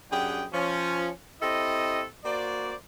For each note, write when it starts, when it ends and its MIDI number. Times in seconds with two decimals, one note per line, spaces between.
0.11 0.44 42
0.11 0.44 62
0.11 0.44 67
0.11 0.44 68
0.11 0.44 78
0.11 0.44 79
0.53 1.09 53
0.53 1.09 61
1.41 2.03 60
1.41 2.03 64
1.41 2.03 67
1.41 2.03 69
1.41 2.03 75
2.24 2.74 58
2.24 2.74 66
2.24 2.74 72
2.24 2.74 74